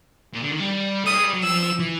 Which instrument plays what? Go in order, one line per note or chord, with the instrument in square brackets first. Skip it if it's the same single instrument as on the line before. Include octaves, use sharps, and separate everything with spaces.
[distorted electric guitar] A#2
D3
D#3
G3
[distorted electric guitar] A3 [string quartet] D#6
[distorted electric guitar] G#3
G3
F#3
[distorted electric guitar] F3 [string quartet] E6
[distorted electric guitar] E3